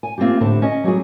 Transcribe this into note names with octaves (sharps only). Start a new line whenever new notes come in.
G#5
A#3 C4 D#4 F4 G4
A2 D3 C4 G4 A5
C#4 D#5
F#3 G3 F#4 G#4